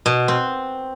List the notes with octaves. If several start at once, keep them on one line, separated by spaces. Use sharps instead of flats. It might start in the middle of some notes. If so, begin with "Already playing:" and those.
B2
C4